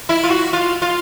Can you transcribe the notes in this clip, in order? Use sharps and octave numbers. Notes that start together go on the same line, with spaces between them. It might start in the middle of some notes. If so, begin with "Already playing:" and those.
E4
F4
F#4
F4
F4